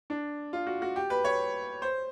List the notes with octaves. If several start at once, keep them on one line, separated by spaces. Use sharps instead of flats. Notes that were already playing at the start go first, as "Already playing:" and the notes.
D4
F4
F#4
F#4
G4
B4
C#5
C5